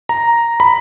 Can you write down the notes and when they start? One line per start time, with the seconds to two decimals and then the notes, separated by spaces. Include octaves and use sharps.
0.09 A#5
0.60 B5